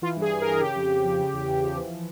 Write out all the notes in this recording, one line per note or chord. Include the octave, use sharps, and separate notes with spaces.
E3 F4
G2
G#4
E3
A#4
G2
C#3 G4
F2
F2
F3
C#3
E2
E2
F3
E3